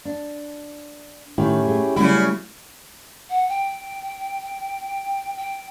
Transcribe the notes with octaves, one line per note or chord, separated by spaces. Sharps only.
D4
A2 D#3 A3 C#4 E4 G4
A3 G#4
C#3 F#3 G3 A3 C#4 E4 F#4
F#5
G5
G5